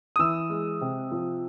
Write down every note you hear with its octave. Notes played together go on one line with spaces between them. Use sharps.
D#6
E3 E6
G#3
C3
F3